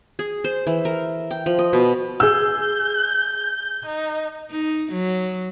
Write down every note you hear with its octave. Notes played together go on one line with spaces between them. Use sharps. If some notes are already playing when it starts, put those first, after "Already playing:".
G#4
C5
E3
A#4
G5
F3
D#5
B2
G#4 E6 G6
D#4
D#4
F#3